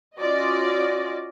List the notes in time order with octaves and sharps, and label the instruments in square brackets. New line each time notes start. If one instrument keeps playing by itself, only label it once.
[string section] C#4 F4 F#4 D5 D#5